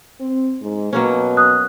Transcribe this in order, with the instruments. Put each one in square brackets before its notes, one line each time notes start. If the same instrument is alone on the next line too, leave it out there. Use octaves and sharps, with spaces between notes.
[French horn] C4
G#2
[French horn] B2 [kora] F#3 A#3 C#4
[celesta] D#6 F#6